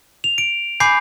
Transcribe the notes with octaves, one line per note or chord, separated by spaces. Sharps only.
F7
D7
G#5 B5 D6 G6 C7